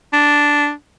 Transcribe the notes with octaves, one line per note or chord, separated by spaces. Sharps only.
D4